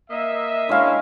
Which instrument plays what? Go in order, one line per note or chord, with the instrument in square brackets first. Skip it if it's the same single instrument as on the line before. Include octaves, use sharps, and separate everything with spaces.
[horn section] A#3 D#5 E5
[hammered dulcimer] G#3 F5 [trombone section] C#4 D4 E4